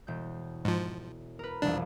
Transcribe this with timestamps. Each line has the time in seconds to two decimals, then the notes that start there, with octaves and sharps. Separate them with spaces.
0.07 E1 G6
0.65 G#2 F3
1.39 A#4 B4
1.62 E1 C2 F2 D4